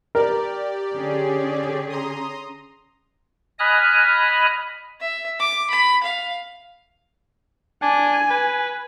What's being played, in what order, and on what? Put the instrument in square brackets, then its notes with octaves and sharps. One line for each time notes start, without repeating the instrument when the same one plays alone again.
[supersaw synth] G4 D5 [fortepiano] A#4
[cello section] D3 C#4 G#4
[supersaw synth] A#5 C6 D#6
[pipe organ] D#5 G#5 B5 D#6 F6 F#6
[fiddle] E5
D6
B5
F5
[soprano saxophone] D4 [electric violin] G#5
[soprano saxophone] B4